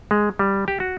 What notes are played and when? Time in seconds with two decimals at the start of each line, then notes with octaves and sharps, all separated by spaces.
0.11 G#3
0.39 G3
0.68 G4
0.80 F#4